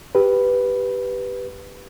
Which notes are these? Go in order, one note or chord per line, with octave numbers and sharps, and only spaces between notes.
G4 B4